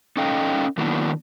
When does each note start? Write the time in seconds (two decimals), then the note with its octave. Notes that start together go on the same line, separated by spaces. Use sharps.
0.17 C#4 D#4 A4 D#5 F5 G5
0.78 D#3 F#3 A#3 B3 D4 E4